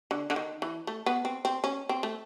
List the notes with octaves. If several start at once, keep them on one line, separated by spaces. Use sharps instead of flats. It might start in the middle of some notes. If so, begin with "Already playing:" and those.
D3
D3
D#3
E3
A3
B3
C4
C4
C#4
C4
A3